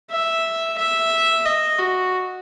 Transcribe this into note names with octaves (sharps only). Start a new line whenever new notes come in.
E5
E5
D#5
F#4